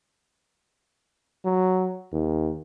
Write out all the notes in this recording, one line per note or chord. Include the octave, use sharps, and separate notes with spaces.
F#3
D#2